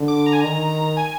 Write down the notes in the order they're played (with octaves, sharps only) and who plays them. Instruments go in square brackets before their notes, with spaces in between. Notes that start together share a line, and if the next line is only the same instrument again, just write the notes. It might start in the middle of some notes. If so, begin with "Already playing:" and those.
Already playing: [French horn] D3
[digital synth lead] D6
A#5
G#5
[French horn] D#3 [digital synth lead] A#5
[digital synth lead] G#5